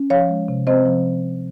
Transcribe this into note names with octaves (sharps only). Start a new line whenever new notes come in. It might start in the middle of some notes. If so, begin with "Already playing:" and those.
Already playing: C#4
F3 C#5 F5
G#3
C3
C4 C5 D#5
F3